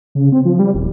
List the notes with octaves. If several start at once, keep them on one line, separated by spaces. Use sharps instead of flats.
C#3
C4
F3
G3
D#1